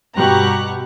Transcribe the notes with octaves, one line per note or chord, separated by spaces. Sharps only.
G2 B2 G4 A#5 C#6 F#6